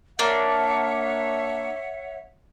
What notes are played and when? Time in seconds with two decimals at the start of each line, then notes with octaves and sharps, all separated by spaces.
0.19 A#3 D4 C#5 E5 F#5